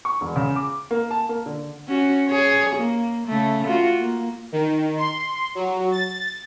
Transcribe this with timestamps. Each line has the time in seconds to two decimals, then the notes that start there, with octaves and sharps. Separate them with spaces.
0.05 C#6
0.21 E1
0.36 C#3
0.56 D6
0.91 A#3
1.11 A5
1.29 A#3
1.46 D3
1.88 C#4 F#4
2.28 G#4 C#5
2.75 A#3
3.27 C#3 A3
3.67 F4 F#4
3.99 A#3
4.52 D#3
4.98 C6
5.55 F#3
5.92 A6